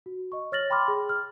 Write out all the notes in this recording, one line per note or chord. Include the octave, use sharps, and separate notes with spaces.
F#4
D#5 C#6
C#5 F6 A6 A#6 F#7
G5 B5 C6 D6 F6
G#4
F6